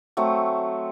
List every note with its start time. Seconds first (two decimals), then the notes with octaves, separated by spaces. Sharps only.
0.17 F#3 A3 C4